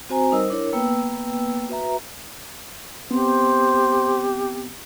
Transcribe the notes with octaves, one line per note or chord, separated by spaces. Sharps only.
C4 F#4 C5 G#5 A#5
G3 D#4 A#4 C5 D#5 E6
D4 E4 A#4 C#5
A#3 B3 B4 G5 E6
F#4 B4 E5 A#5
B3 C4 G4 C5